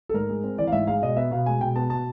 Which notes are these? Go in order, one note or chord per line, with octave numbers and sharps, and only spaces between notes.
A4
G#2 A#4
G#3
C4
E3 D5
F5
G#2 E5
G#3 F5
B2 D#5
B3 E5
B2 F5
G#3 G#5
B2 G5
B3 A5
B2 A5